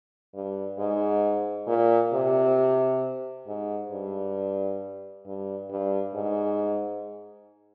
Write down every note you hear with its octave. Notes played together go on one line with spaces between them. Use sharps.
G2
G#2
A#2
C3
G#2
G2
G2
G2
G#2